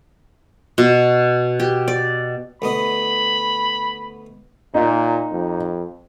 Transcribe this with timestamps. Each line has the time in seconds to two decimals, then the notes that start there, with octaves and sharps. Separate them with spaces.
0.78 B2
1.60 G4
1.88 D5
2.62 D2 B3 D#5 B5
4.74 A#2 D#4
5.31 F2